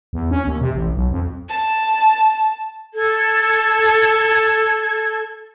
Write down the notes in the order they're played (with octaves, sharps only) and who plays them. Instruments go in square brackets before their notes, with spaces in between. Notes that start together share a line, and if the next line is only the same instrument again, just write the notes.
[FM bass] E2
C#4
D#2
C3
A1
B1
F2
[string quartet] A5
[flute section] A4 G#6